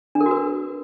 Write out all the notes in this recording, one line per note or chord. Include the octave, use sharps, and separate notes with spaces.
D4
A#4
F#4
B4